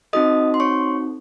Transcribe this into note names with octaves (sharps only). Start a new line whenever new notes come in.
C4 D#4 F#4 A4 D#5 D#6
C6
C#5 C#6